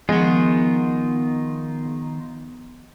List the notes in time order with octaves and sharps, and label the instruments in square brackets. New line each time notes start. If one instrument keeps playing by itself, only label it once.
[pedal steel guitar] D#3 D#4 F4 [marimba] F3 [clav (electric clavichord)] G#3 [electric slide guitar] B3 F#5